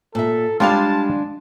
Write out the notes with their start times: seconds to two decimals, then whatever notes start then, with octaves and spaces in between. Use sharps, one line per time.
0.15 A#2 A4 E5
0.60 G3 G#3 D4 F4 F5 A5